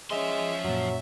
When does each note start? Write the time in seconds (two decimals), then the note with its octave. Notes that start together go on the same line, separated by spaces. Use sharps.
0.10 F3 G#3 C#4 E5 C6
0.64 F#2 A#2 F#3